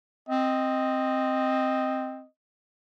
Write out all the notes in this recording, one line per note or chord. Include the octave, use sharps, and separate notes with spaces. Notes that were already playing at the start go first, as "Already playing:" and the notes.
C4 D#5